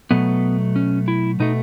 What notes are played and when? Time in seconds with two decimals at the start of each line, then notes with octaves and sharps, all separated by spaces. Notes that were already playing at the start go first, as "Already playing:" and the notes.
0.11 B2 F#3 A3 B3
0.76 C#4
1.08 E4
1.40 B2 A3 D#4